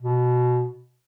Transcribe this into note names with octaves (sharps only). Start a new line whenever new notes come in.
B2